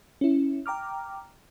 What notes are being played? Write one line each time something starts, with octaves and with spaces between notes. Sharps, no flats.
C#4 E4
G5 A#5 D6 F6